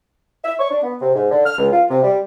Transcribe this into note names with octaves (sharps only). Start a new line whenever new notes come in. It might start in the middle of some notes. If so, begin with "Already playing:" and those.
E5
C#6
D4
B3
C3
G#2
D3
F6
C#2
F4
C3
G3